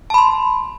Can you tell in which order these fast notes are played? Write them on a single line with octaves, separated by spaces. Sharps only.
A5 B5 C6